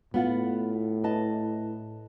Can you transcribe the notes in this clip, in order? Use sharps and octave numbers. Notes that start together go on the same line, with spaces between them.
A2 B3 F4 F#5
B4 D#5 A5